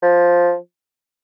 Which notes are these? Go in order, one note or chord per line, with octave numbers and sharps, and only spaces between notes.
F3